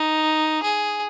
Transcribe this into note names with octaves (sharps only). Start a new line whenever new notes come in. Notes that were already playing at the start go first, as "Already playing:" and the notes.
Already playing: D#4
G#4